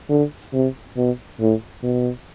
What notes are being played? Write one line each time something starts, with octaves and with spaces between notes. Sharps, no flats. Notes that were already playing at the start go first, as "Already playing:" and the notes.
D3
C3
B2
A2
B2